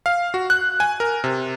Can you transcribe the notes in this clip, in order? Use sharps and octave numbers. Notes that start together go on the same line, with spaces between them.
F5
F#4
F#6
G#5
A#4
C3